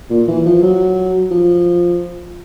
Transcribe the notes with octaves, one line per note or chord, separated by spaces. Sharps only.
A#2
E3
F3
F#3
F3